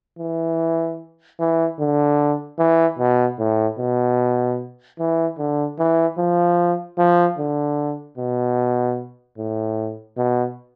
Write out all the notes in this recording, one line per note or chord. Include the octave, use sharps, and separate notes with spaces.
E3
E3
D3
E3
B2
A2
B2
E3
D3
E3
F3
F3
D3
B2
A2
B2